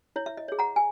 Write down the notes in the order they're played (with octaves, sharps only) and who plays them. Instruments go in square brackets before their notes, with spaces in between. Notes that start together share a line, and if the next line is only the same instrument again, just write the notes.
[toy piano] E4 C#5
E5
D#5
G#4 C#5
F#5 A#5
G#5